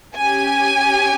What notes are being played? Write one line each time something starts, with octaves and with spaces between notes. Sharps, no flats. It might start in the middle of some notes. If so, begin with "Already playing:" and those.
C#4 G4 G#5